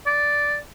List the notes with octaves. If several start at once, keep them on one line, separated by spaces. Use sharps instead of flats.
D5